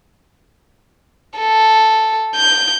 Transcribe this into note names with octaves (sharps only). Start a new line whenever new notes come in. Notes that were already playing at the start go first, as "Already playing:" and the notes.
A4
G6